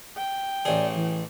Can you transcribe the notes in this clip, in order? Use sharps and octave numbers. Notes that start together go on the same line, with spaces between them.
G5
A1 G#4 D5
E3